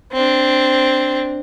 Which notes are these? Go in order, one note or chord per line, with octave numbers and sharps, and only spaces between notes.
C4 D4